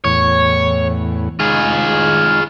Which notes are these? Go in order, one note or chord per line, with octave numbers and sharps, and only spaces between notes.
E2 A2 C#5
G#3 D#4 F4 G#4